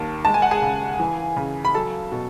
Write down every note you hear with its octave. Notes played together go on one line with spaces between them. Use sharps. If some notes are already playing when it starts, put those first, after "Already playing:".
Already playing: D#2 D#3 A5
G#3 A5
G#5
F#5
G#4 G#5
C#3
E3
C#3
B5
F#3 A4 A5
B2